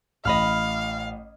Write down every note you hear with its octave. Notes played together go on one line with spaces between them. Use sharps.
A1 D#5 F5 B5 F6